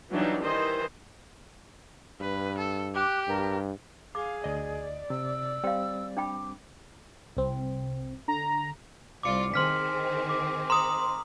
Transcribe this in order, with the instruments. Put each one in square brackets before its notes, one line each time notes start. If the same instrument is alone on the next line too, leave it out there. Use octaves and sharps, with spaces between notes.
[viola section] E3 F#3 G3 D4 D#4
D#3 E3 C5 D#5
[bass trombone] G2 [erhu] B4
[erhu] A4
[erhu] G4 [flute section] D6 F#6
[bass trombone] G2 [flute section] A#4
[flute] G#4 [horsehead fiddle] F5 [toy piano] D6
[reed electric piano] D2 D#5 [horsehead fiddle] D5
[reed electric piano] C3 [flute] E6
[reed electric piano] G3 C4 [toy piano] F5 G5
[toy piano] D4 G5 B5 [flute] D6
[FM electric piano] C2 C4
[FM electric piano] D3 [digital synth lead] A#5
[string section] C2 F4 D5 [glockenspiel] D6 C#7
[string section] D#3 C4 G#4 [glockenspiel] C6 F6 B6
[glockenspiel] D6
[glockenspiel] A#5 [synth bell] C6 D#6